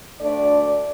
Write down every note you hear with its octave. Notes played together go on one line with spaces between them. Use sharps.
D2 D3 A3 D4 D5